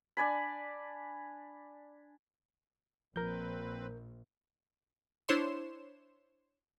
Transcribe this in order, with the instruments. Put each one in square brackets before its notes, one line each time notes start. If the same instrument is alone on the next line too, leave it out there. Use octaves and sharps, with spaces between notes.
[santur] D4 D5 G#5 B5
[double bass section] A#1 [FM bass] F3 [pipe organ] C4 B4 [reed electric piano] A#4 G6
[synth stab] D4 E4 C5 C#5 C6 E7